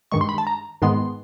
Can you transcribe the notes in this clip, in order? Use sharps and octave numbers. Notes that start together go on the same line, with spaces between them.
G2 D#3 G#3 C#6
C6
B5
A5
A#5
G#2 D#3 G#3 B3 C6